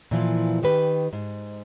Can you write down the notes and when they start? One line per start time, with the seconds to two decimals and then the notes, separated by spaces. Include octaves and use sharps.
0.11 A#2 E3 F3
0.63 D#3 G4 B4
1.13 G#2